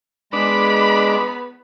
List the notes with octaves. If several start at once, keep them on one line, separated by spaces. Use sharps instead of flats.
G#3 B3 D4 B5